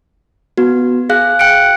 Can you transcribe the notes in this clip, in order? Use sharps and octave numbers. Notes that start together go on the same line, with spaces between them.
B3 F#4
G#4 F5 F#6
G5 F#6 C#7 D7